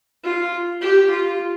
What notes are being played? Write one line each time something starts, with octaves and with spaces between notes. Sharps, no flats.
F4
G4
F4